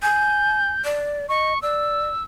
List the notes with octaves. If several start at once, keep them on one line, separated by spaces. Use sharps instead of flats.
G#5 G6
D5
D#5 C#6
D5 E6